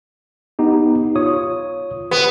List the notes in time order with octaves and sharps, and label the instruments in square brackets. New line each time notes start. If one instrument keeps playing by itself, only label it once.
[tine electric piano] B3 D#4 G4
F4 C#5 D#6
[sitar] B3